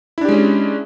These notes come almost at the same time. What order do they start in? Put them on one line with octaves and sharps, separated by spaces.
E4 D4 G4 G#3 C#4